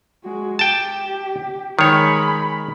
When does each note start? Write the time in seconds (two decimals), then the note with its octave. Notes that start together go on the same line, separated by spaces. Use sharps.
0.24 G#3 F#4
0.59 G4 G5 A5
1.79 D#3 G#3 C#5 B5